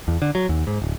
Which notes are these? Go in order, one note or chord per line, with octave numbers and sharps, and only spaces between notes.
E2
D3
F#3
D#2
G#2
D1